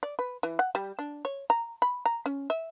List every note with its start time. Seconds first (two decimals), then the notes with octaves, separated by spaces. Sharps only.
0.03 D5
0.19 B4
0.43 E3
0.59 F#5
0.75 G3
0.99 D4
1.25 C#5
1.50 A#5
1.82 B5
2.06 A#5
2.26 C#4
2.50 E5